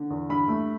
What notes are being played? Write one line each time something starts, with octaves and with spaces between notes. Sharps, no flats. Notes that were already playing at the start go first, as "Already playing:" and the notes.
Already playing: D3
E2
G2 B5
A3